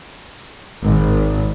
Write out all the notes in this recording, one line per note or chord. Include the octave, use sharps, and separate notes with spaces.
G#1